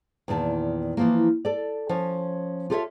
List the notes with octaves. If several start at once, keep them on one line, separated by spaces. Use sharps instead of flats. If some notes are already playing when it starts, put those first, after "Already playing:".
E2 A#2 D#3 A5
E3 F3 A#3
A4 D5
F3 C#4 C#5
F4 G4 A4 B4 C#5 E5